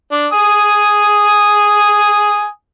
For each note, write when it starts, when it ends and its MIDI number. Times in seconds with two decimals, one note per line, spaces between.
0.12 0.27 62
0.33 2.48 80
0.33 2.48 87